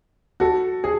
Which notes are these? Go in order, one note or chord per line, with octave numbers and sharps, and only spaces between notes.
F#4 A4
G#4